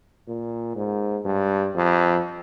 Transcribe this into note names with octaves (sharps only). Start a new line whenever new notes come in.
A#2
G#2
G2
F2